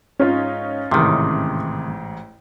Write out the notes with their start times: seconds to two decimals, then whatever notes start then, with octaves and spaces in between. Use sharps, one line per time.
0.20 G#2 C#4 D#4 F4
0.91 A1 G#2 C3 D#3 E3